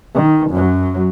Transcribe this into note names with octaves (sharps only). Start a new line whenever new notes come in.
D#3
F#2 F#3